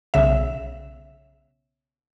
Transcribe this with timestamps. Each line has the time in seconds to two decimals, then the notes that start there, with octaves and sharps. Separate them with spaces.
0.14 B1 C#3 E5